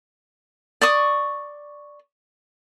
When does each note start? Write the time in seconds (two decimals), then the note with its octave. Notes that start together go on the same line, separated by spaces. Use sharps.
0.81 D5 C#6 D#6